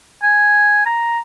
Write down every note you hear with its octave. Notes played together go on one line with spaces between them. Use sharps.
G#5
A#5